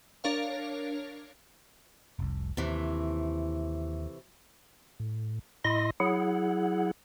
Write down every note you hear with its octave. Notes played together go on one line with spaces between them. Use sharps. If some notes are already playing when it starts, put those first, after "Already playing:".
D4 A#4 C#5 F5
F1 C2
D#2 C3 E3 A3
A2
A2 E4 D#5 C6 A#6
F#3 E4 G#4 F#5